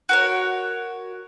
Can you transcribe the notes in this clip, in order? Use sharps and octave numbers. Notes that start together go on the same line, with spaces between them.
F#4 A#4 C#5